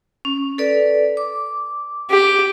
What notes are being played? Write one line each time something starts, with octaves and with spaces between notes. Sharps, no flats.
C#4
A4 B4 D5
D6
G4